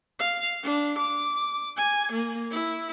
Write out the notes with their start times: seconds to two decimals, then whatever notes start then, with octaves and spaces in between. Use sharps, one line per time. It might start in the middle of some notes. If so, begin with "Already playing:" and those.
0.19 F5
0.63 D4
0.98 D6
1.77 G#5
2.12 A#3
2.51 E4